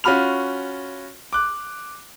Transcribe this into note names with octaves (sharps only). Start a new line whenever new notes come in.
C#4 F4 F#4 B5 F6 F7
D6 F#6